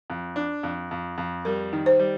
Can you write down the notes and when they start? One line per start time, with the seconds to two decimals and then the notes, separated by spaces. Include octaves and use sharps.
0.10 F2
0.36 D4
0.63 F2
0.91 F2
1.18 F2
1.45 G3 A#4
1.73 D#3
1.86 C5
1.99 G3